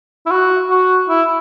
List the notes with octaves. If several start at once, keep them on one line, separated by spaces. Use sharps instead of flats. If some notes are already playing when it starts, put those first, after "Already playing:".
E4
F#4
F#4
E4